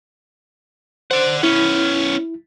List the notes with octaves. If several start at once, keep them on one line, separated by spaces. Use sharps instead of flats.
C5 D5 F#5
B3 C#4 E4